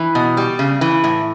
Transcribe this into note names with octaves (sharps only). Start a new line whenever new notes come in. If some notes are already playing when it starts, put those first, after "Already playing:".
Already playing: E3
B2
G3
C#3
E3
A2